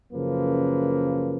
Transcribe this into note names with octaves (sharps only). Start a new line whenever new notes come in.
F#2 C#3 F3 A#3 B4